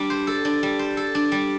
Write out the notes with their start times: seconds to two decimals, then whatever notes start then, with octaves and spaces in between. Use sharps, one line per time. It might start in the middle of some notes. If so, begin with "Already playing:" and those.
Already playing: G3 D4
0.10 C5
0.27 A4
0.45 D4
0.63 G3
0.79 C5
0.97 A4
1.15 D4
1.32 G3